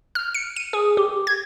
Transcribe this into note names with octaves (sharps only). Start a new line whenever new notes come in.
F6
C#7
D#7
G#4
G4
G#6